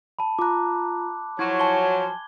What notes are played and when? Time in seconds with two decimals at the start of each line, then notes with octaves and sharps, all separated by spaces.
0.19 A5 B5
0.39 F4 A#5 D6 F#6
1.39 F3 F#3 E4 C#6 G#6
1.59 G#5 A5 C6 G7